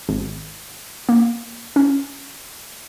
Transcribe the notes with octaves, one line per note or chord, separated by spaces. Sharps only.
G#1
A#3
C#4